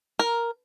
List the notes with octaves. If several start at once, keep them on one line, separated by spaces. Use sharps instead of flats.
A#4